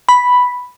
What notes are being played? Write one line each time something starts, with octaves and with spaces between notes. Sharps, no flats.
B5